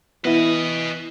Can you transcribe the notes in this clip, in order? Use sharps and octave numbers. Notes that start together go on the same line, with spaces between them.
E3 B3 E4 B4 D#5